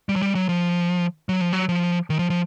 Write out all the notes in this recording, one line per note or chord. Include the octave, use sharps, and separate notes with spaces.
G3
F#3
G3
F#3
F3
F#3
F3
F#3
F3
D#3
F3
F3